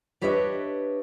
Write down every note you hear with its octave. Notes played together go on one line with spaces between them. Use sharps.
D4 G4 B4 C#5 D#5 E5